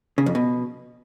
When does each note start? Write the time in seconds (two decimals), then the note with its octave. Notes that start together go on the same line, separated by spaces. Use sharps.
0.18 C#3
0.26 F2
0.35 B2